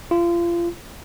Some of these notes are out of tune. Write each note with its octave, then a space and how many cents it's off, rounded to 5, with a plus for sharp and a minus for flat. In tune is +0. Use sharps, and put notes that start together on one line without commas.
F4 -30